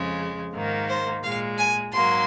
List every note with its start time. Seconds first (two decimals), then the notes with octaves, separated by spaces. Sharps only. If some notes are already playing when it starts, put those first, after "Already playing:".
Already playing: F2 C#3 G#3
0.54 G#2 D#3 A#3
0.89 C5
1.23 A#2 G#3 F5
1.58 G#5
1.93 G#2 F#3 A#3 C6